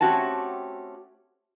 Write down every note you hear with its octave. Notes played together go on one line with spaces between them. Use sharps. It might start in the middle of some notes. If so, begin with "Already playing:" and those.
A3 C4 C#4 F#4 G4 A5